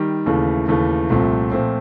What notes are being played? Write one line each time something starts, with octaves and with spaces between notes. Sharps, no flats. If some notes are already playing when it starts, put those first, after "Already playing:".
Already playing: D#3 G3
D#2 C#3 E3 A3
D#2 C#3 E3 A3
C2 A#2 F3 A3 C4
A#2 F3 A3 C4